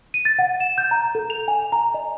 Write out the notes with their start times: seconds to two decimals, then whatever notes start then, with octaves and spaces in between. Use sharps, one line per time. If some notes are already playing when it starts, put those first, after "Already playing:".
0.14 D#7
0.25 A6
0.39 F#5
0.60 E7
0.78 G6
0.91 A#5
1.15 A4
1.30 F7
1.48 G#5
1.72 A#5
1.94 D#5